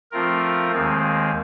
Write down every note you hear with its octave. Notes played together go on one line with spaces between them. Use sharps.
F3 A3 C4 F4 A#4
D#2 D#3 G#3 C4